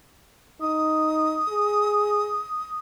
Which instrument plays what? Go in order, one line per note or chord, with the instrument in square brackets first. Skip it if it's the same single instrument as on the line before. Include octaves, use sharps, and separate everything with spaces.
[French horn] D#4 [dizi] D#6
[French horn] G#4